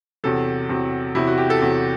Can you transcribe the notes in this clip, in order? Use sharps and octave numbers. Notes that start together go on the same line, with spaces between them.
E2 C3 F#3 A4
E2 C3 F#3
E2 C3 F#3 E4
F#4
G4
A4
E2 C3 F#3